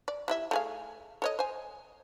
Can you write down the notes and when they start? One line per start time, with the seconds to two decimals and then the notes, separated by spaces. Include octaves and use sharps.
0.08 D5
0.28 G3 E4 E5
0.51 A3 G#4 F5
1.22 A4 C#5 D#5
1.39 C5 G#5